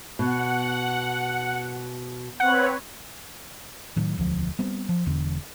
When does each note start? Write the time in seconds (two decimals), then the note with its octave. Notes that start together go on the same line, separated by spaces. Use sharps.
0.19 B2 F#5
2.40 C4 B4 C#5 F#5
3.96 A2 D#3 F#3
4.17 E1 D2 F3
4.59 G3 B3 C4
4.89 F3
5.06 E1 E2 D3